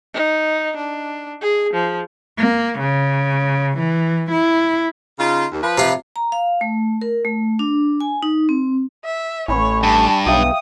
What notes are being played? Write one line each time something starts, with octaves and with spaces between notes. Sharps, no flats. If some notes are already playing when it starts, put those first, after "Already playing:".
D#4
D4
G#4
F3
A#3
C#3
E3
E4
C#3 D#4 F4
D#2
F3 B4
C3 F4
A#5
F5
A3
A#4
A3
D4
G#5
D#4
C4
E5
A1 C#5 G#5 B5 C#6
G2 A5
B1 E5 F5 G5 D#6